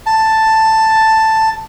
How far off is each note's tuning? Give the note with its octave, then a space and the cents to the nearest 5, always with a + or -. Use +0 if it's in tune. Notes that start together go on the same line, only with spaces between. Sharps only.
A5 +5